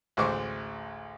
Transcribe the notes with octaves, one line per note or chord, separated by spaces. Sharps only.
A1 D2 G#3 C5 C#6 D6